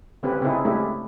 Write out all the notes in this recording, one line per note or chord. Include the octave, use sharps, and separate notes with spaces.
D3 C4 C#4 G4 B4
C#3 C4 C#4 D#4 E4 G#4
G#3 A3 C#4 D4 E4 G4